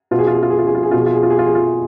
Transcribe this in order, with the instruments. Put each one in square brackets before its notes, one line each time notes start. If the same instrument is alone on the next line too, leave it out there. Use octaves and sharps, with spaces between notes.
[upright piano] B2 F4
G#4
F4
G#4
F4
G#4
F4
G#4
F4
G#4
B2 F4
G#4
F4
G#4
F4
G#4
F4
G#4
F4